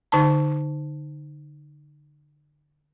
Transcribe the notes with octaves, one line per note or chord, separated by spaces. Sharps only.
D3 D#4 A5